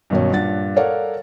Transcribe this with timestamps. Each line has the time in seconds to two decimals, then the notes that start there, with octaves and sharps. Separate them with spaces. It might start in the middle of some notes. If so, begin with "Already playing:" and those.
0.10 G2 B2 D#3 F#3 C#4
0.30 G2 A#2 D4 F#5 A6
0.76 A4 A#4 C#5 D5 F5 F#5